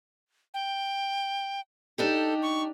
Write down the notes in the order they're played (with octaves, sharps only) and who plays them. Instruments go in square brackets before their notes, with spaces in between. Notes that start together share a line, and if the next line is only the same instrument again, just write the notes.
[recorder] G5
[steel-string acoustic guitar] D4 D#4 G4 [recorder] A4
[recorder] C#6